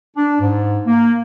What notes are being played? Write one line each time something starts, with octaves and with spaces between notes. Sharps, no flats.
D4
G#2
A#3